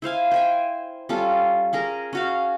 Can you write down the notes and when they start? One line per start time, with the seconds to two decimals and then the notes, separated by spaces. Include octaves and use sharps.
0.02 E4 C5 F5 G#5
0.31 C5 G5 G#5
1.09 G3 C#4 F4 A4
1.73 C#4 G#4 A#4
2.13 C#4 F#4 F5